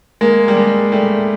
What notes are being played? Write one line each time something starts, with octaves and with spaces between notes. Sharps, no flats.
G#3 A#3
G3
G#3
G3 A3